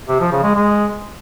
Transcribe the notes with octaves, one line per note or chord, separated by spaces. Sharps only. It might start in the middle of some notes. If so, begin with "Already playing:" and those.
C3
F3
C#3
G#3
G#3